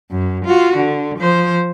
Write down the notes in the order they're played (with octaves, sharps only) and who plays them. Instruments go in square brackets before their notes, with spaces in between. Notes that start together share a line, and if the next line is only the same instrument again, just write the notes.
[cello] F#2
F4 F#4
D3
F3 C5